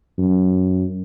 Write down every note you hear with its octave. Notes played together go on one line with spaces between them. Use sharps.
F#2